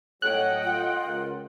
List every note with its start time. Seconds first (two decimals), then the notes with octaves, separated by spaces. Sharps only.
0.22 A2 F#3 A4 C#5 D#5 F#5 G5 F#6
0.63 F4
1.05 C#2 A#4